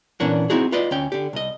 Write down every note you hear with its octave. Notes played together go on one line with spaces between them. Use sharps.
A#2 E3 B3 C#4 D4 A#4
C4 D#4 E4 F#4 G#4
F4 B4 D5 D#5
D2 C#4 G5
D3 G4
C2 D#5